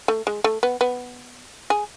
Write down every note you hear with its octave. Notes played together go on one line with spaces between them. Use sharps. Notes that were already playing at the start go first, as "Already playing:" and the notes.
A3
G#3
A3
B3
B3
G#4